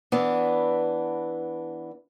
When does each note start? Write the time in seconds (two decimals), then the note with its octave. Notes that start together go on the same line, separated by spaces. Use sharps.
0.12 E3 B3 D4